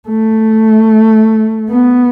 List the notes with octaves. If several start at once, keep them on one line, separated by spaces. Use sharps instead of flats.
A3
B3